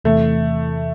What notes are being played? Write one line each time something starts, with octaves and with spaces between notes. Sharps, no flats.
E2 C3 E3 A3